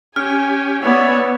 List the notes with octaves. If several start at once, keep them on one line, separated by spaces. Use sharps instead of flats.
C#4 G4 G#5 F6
B3 C#5 D5 E5 G#5